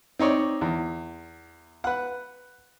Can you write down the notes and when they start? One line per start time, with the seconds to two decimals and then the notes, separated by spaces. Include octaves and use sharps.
0.19 C4 D#4 C#5 D5
0.61 E2
1.84 B4 F#5